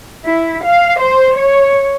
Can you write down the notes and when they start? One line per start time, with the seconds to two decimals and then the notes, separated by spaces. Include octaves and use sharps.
0.25 E4
0.64 F5
1.00 C5
1.37 C#5